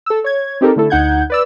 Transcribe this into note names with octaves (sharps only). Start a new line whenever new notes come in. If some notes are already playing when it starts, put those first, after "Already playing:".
A4 E6
C#5 G#6
C4 D#4 G4 A4 A#4
D3 A3 E4 A4
D2 D#4 F#5 G6 G#6
B4 D5 E6